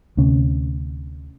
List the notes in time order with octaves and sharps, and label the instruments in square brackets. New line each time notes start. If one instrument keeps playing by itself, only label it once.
[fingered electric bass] D2 C3 C4 C#4